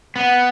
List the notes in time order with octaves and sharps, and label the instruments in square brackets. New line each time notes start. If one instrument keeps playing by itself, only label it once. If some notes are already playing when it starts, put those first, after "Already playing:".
[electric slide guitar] B3